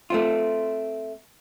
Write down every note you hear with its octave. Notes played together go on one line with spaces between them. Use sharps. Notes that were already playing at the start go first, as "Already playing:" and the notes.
A3 C4 F4